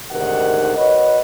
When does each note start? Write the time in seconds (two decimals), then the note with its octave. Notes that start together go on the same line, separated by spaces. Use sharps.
0.12 D2 G#2 C3 D#3 A#4 F#5
0.76 F#4 B4 C#5 D#5